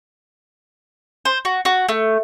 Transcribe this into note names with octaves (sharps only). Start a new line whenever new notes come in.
C5
F#4
F#4
A3